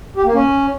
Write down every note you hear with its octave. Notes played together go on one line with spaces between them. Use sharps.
G4
A#3
C#4